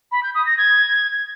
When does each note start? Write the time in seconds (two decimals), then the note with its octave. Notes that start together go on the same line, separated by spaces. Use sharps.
0.12 B5
0.23 G6
0.35 D#6
0.46 A#6
0.58 G#6